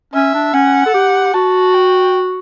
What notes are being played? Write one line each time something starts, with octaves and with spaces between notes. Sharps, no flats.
C#4 E5
D4
C#4 F#5
A4
G4
F#4 A5
G5